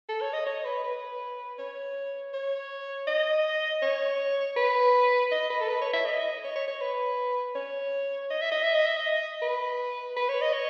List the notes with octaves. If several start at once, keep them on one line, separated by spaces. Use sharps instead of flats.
A4
C#5
D#5
C#5
B4
B4
C#5
C#5
D#5
C#5
B4
D#5
B4
A4
B4
C#5
E5
D#5
C#5
C#5
C#5
B4
C#5
D#5
E5
D#5
E5
D#5
E5
D#5
B4
B4
C#5
D#5
C#5